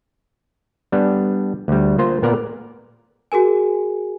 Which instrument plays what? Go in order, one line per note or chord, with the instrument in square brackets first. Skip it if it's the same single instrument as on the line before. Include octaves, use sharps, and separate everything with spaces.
[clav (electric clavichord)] G3 B3 D4
D2 G3
A#3 F4 C5
A#2 B3 A#4 D5
[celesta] F#4 G#4 A#4 G#5